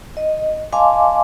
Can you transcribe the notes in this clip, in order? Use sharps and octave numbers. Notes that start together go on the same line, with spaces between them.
D#5
D#5 F5 G#5 A5 C6 D6